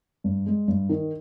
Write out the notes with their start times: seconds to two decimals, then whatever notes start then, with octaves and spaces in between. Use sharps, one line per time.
0.24 G2
0.47 G#3
0.68 G2
0.89 D#3